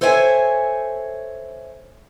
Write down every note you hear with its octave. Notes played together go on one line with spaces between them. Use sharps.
A4 C5 C#5 E5 F#5 G#5